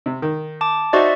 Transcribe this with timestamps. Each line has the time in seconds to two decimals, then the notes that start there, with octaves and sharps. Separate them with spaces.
0.06 C3
0.22 D#3
0.61 A5 D6
0.93 D#4 F#4 C5 D5 E5 C#6